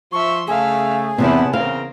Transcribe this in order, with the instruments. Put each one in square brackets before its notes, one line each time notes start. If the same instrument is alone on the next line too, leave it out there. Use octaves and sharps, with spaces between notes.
[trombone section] F3 [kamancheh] E5 C6 [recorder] C#6
[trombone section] C#3 A3 [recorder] G#4 [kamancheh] E5 F5
[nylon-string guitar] E2 G#2 C3 [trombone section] B3 [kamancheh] E4 A5
[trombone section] E2 C#3 [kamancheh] C4 A#4 [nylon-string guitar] F5